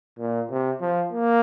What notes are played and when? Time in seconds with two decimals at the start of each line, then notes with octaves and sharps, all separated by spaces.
0.19 A#2
0.50 C3
0.81 F3
1.12 A#3